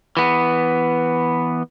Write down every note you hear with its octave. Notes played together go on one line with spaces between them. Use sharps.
E3 B3